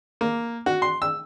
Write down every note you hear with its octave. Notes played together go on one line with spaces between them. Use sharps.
A#3
F#4
C6
E6